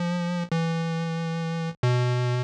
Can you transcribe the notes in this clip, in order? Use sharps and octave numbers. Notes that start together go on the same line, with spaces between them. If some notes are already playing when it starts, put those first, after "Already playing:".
Already playing: F3
E3
B2